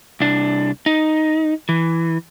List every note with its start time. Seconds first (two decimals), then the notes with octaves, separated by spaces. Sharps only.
0.20 C2 D4
0.86 D#4
1.69 E3